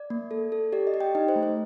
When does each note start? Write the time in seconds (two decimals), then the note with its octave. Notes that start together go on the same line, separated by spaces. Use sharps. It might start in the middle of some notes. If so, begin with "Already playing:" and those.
Already playing: D5
0.10 A#3
0.31 A4
0.52 A4
0.72 G4 D5
0.87 D#5
0.94 G4
1.00 G5
1.15 D#4 D#5
1.28 C5
1.36 A3
1.43 C5